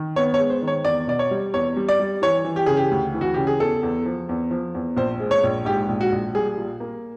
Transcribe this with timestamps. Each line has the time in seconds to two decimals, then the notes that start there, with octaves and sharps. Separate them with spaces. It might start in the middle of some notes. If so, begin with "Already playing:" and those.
Already playing: D#3
0.16 B3 C#5
0.34 C#5
0.39 G#3
0.50 C5
0.62 D#3
0.67 C#5
0.85 E2 D5
1.07 B2 D5
1.19 C#5
1.31 G3
1.54 E2 C#5
1.77 G3
1.89 D5
2.00 G3
2.22 E3 C#5
2.45 E3
2.56 G4
2.66 C#3 G#4
2.77 G4
2.91 D2
3.14 E3
3.21 F#4
3.34 C#3 G4
3.47 G#4
3.60 E2 A4
3.83 E2
4.06 F3
4.29 E2
4.51 F3
4.75 E2
4.97 A#1 C5
5.20 G#3
5.31 C#5
5.44 A#1
5.65 G#2 G4
5.89 A#1
6.01 F#4
6.12 A#1
6.35 G3 G#4
6.57 A#2
6.80 A#3